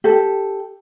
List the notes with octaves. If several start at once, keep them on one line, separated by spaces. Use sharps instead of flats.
G4 A4